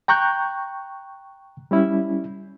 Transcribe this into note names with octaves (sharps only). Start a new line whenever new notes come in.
G5 A#5 C#6 F#6 G6
G3 C#4 E4